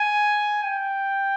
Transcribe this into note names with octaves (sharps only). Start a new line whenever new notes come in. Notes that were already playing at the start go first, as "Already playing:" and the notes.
Already playing: G#5
G5